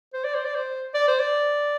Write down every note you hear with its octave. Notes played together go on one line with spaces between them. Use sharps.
C5
D5
C5
D5
C5
D5
C5
D5